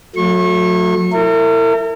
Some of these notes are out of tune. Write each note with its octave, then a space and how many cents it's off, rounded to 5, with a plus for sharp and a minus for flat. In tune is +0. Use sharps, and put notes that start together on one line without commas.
F#3 -40 A3 +5 C#6 -35
E4 +0 A#4 -45